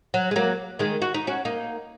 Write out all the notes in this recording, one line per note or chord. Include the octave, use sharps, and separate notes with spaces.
F#3
G#3
F#3 A#3
D#3 G#3
F#4
D#4
C#4 F#4
A#3 D#4